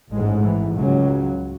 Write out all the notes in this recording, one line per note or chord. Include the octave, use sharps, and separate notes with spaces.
A1 G#2 G#3
E3
C#2 C#3 F#3